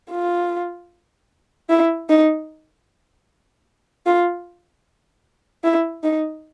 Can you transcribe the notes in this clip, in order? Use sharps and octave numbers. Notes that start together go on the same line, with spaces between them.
F4
E4
D#4
F4
E4
D#4